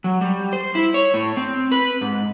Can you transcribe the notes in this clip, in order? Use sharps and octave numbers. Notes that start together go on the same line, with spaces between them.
F#3
G3
C5
E4
C#5
A2
C4
B4
G#2